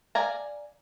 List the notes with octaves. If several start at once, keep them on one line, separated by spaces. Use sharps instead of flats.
D5 F5 G#5 A#5